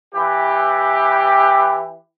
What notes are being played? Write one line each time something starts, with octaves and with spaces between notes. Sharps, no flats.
E3 G4